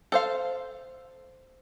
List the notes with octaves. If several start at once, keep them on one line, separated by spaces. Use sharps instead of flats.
A4 C5 F5